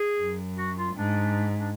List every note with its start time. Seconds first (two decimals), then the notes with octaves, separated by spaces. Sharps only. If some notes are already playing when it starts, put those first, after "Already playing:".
Already playing: G#4
0.22 F#2
0.58 F#4
0.77 F4
0.95 G#2 D4
1.59 D4